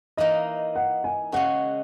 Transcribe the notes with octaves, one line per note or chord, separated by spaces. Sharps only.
E3 A#3 D#4 D#5
F#5
G#5
C#3 G#3 C#4 F#4 F#5